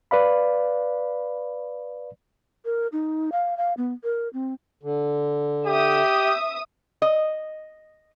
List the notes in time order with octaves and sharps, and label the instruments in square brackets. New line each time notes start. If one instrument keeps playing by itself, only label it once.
[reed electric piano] B4 D5 F5 B5
[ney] A#4
D#4
F5
F5
B3
A#4
C4
[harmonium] D3
[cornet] G4 [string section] E5 D#6
[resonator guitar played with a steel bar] D#5